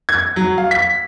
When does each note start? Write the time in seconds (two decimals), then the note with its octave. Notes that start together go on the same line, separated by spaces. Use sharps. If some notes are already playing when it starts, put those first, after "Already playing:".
0.09 G#6
0.36 F#3
0.58 F5
0.71 B6